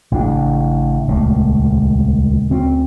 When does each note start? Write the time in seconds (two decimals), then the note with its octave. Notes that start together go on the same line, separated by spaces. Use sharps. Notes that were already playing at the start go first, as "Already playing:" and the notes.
0.12 A1 C#3 G3 D4
1.08 D#1 C#2 A#2 A3
2.50 D2 C4 C#4